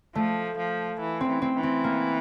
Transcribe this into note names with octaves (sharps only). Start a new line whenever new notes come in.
F3 A3
F3
E3
C4
E3
C4
E3
C4
A#3